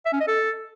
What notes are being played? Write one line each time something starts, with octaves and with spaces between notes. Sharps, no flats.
E5
C#4
D#5
A4